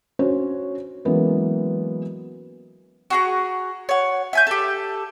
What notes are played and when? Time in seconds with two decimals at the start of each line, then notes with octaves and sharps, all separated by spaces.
0.19 C#4 D4 F#4 C5 C#5
1.05 E3 F#3 G#3 A#3 B3 C#4
3.10 F#4 G#4 A#5
3.89 C#5 F#5
4.33 E5 G#5 G6
4.47 G4 A4